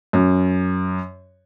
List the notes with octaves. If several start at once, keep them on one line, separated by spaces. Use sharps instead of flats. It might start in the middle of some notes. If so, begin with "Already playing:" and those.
F#2